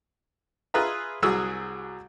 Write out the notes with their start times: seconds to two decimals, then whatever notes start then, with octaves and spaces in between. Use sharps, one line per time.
0.74 F4 G#4 B4 E5 A#5
1.23 C2 F#3 G#4 E6